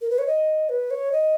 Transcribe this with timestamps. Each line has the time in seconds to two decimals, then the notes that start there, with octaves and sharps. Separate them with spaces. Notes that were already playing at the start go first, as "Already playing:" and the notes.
0.02 A#4
0.10 B4
0.18 C#5
0.27 D#5
0.69 B4
0.91 C#5
1.12 D#5